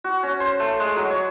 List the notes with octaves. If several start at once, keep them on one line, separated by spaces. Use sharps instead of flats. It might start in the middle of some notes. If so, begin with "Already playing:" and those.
F#4
C#4
C5
A3
G#3
F#3
C#5